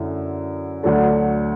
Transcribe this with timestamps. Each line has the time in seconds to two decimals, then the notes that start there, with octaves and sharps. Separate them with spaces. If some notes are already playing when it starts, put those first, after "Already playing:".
Already playing: F#2 D3 A3 E4
0.83 D2 D3 F#3 A3 D4